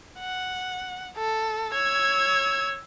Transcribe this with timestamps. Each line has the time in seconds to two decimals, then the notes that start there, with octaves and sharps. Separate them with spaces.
0.20 F#5
1.17 A4
1.73 C#5 E6 G#6